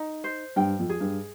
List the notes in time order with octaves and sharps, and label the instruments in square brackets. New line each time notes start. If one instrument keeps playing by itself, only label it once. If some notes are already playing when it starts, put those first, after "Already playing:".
Already playing: [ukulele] D#4
C5
[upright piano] G2 [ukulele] G5
[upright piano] F2
[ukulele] G#4
[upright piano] G2